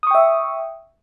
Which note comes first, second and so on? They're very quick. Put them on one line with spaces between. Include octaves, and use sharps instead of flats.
D#6 C#6 G5 E5